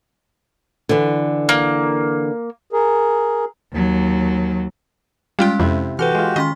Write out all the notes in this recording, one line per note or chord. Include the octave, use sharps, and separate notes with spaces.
D3 E3
A#3
G#4 A#4
D#2 F#3
G3 G#3 C#4 F4 F5 G5
F2 C3 E4 C5
E3 F#4 G4 A4 B4 F6
G#3 F4
D#3 C#4 D#5 C6